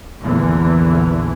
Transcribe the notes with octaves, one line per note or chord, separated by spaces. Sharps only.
A#1 E2 D3 E3